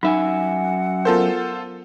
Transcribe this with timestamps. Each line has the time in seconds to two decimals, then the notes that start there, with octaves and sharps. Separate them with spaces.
0.03 F#2 D#4 E5 F#5 G#5
1.05 B3 F4 A4 A#4 C5